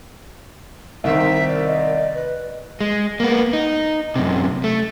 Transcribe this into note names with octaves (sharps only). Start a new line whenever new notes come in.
C2 D#3 C4 D#4 E5
A#4 D5
D#5
B4
G#3
A#3 B3
D#4
F#2 C3
A3